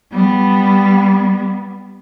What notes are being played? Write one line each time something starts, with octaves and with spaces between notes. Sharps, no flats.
G3 B3